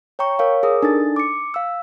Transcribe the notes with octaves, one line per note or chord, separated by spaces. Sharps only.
C#5 G5 A#5 C#6
A#4 C#5 F5
G#4 A#4 D#6
D4 D#4 A4 A6
D6 C#7
F5 E6